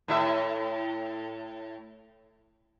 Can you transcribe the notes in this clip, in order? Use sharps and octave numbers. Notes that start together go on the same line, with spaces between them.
A2 E4 E5